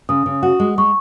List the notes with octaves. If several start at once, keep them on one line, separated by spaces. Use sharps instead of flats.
C#3 D#6
C#3
F#4
G#3
G#3 C#6